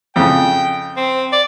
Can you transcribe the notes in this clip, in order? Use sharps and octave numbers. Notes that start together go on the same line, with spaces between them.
F2 C#3 G5
C4
D5